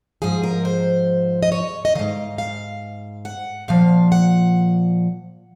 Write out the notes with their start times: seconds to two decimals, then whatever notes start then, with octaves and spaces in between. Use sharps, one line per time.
0.22 G#2 F3 G#4
0.44 A#4
0.65 C5
1.43 D#5
1.52 C#5
1.85 D#5
1.95 G#2 D#3 F5
2.38 F5
3.25 F#5
3.68 A#2 F3 F5
4.12 F#5